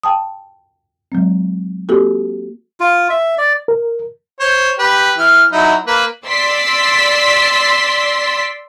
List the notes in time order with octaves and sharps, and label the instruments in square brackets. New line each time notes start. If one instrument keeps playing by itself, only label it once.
[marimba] G5 A5 D#6
F#3 G#3 C4
A#3 C4 F#4 G4 A4
[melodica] F4
E5
D5
[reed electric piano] A#4
[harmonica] C5 C#5
G4 B4
E3 F6
F#3 D#4 E4
A#3 B4
[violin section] D5 C6 E6 B6